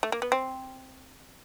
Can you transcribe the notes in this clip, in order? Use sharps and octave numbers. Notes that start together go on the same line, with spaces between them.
A3
A#3
B3
C4